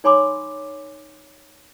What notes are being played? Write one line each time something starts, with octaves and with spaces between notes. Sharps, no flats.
D#4 C#5 G#5 B5 C6 D6